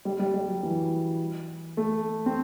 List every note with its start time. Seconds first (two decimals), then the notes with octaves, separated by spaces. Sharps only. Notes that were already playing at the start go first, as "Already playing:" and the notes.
0.05 G3
0.19 G3
0.34 G3
0.48 F#3
0.63 E3
1.77 A3
2.26 C4